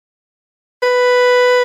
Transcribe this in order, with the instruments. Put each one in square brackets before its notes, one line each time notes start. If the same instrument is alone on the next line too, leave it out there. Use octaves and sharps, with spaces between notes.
[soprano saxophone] B4